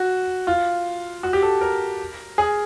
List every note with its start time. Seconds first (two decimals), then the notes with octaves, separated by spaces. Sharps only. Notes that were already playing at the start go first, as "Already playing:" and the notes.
Already playing: F#4
0.47 F4
1.23 F#4
1.33 G4
1.43 A4
1.61 A#4
2.38 G#4